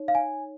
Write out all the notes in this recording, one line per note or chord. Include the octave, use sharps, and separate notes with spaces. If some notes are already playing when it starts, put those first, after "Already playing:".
Already playing: D#4 C#5
F5
G#5